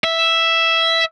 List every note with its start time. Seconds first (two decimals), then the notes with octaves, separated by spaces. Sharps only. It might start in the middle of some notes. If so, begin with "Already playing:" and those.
0.04 E5